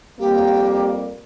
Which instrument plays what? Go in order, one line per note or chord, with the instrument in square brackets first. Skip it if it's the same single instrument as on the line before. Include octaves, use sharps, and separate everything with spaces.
[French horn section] F2 G3 A#3 [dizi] G4